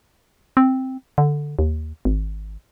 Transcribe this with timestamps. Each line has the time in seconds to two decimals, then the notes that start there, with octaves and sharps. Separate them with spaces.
0.57 C4
1.18 D3
1.59 D#2
2.05 G#1